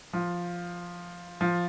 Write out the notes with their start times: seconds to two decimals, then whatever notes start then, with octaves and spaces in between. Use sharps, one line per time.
0.13 F3
1.41 F3